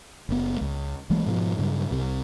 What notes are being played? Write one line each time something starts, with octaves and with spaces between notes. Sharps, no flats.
F#1 B3
C#2
B1 E3 G#3 A#3
G#2 B2 F3
G2 C#3 F#3
C2 C3